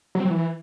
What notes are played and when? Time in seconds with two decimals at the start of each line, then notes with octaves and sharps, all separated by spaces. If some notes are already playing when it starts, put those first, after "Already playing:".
0.15 F#3
0.20 C4
0.25 F#3
0.30 E3